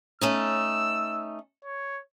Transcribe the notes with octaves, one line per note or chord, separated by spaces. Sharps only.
A3 C#4 D#4 E6
C#5